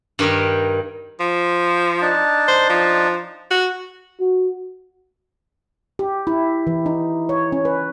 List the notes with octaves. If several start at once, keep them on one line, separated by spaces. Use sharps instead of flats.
G2 D#3 D#4 G4 A#4
F3
D4 D#4 A5
C5
F3
F#4
F#4
G4
E4
E3
D#4
C#5
C#4
B4